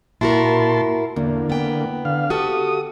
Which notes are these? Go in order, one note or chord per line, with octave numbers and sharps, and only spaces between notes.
A#2 E4 F#4 A#4 A5 C6
E2 D3 A#3
B3 G5
D3 F5
F#4 G4 A4 D#6